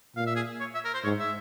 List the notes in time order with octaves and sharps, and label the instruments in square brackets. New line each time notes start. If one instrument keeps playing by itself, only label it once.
[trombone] A#2 [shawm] F5
[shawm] E5
G#4
C#5
E5
A#4
C5
[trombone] G#2 [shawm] C#5
[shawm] E5